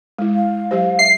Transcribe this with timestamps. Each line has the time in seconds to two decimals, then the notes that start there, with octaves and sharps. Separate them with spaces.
0.19 G#3 E4
0.35 F5
0.71 F#3 G4 C5
0.99 E5 C7